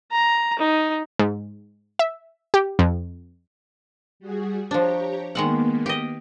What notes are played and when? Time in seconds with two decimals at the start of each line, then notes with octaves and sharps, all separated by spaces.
0.12 A#5
0.59 D#4
1.19 G#2
1.99 E5
2.54 G4
2.79 F2
4.20 G3 F#4 G#4
4.71 F3 D4 G4 C#5 A#5
5.35 D#3 G#3 A#3 B3 F#5
5.86 G4 D#5